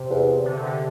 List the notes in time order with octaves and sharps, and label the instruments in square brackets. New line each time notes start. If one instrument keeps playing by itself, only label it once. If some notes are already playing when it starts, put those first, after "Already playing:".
Already playing: [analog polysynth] C3
[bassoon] E2
[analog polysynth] D3
C3
D3